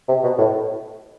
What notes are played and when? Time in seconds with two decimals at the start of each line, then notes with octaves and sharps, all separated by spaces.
0.08 C3
0.23 B2
0.38 A2